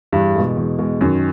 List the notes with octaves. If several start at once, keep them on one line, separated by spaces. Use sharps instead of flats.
E2 G2
B2 G#3
E2
B2 G#3
F#2 D#3